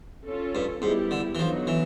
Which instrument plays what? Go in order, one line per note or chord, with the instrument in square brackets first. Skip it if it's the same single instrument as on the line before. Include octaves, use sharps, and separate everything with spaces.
[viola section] C#4 F4 A4
[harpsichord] G2
[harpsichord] G#2 [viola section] G3 B3 E4 G4
[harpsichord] D3
E3
[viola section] D3 F#3 B3 D#4 [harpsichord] F3
[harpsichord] E3